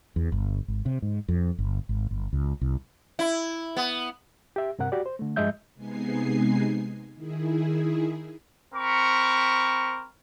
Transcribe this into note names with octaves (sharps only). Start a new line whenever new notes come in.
E2
G1
G#1
C3
G#2
F2
G1
G#1
G1
C#2
C2
E4
B3
G4 E5
G2 C3 A#4 F#5
F#4 G4 D5
C5
D3 A3
G2 F3 G#3 D#5 E5 G6
C3 G#3 B3 D#4 G#5 C7
D#3 E4 G#4
C4 A#4 B5 C#6